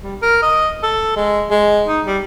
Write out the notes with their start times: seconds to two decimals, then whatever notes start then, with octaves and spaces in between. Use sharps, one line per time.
0.03 G3
0.22 A#4
0.42 D#5
0.83 A4
1.16 G#3
1.50 G#3
1.88 D#4
2.06 G3